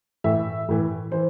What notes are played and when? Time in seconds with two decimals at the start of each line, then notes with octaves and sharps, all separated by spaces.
0.24 A2 E3 E5
0.69 A2 E3
1.12 E3 C5